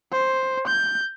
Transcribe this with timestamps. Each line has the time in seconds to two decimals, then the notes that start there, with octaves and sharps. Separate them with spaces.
0.12 C5
0.67 G6